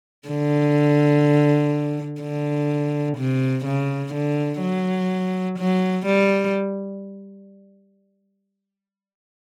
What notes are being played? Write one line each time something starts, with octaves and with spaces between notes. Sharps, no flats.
D3
D3
C3
C#3
D3
F#3
F#3
G3